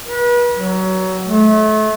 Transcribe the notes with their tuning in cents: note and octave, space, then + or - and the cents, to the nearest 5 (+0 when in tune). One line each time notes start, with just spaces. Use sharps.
B4 -35
F#3 +20
A3 -30